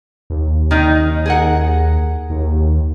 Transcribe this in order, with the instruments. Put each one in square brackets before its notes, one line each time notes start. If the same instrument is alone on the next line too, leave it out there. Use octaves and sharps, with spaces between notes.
[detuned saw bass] D#2
[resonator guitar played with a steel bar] D#3 D#4
G#4 A#4 F#5
[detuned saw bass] D#2